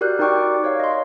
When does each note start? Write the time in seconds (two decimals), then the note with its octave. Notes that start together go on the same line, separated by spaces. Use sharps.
0.01 F#4 G4 A#4 D5 F#6 G6
0.19 D#4 A#4 D5 G5 C#6 D6
0.64 C#5 F5
0.80 D#5 C6